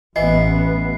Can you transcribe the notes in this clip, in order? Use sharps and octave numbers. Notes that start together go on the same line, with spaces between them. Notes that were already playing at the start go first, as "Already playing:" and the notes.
A1 E3 B3 D#5 C7